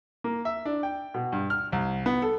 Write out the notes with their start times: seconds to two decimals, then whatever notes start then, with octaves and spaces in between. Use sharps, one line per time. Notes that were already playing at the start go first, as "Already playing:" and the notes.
0.24 A#3
0.45 E5
0.65 D4
0.83 G5
1.14 B2
1.32 G2
1.50 F6
1.72 C2
2.06 B3
2.22 A4